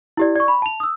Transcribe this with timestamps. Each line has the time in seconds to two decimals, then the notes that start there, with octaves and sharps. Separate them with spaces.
0.17 E4 G4 D5
0.36 D5 C#6
0.48 B5
0.62 A5 F7
0.80 D#6 E6